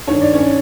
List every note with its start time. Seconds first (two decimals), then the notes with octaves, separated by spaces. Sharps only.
0.07 G2 D#3 C#5
0.21 D5
0.33 C#4 C#5